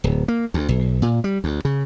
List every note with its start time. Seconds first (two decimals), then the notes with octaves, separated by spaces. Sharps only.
0.04 D1
0.28 A#3
0.54 D2
0.69 B1
1.02 A#2
1.24 G3
1.44 D2
1.65 C#3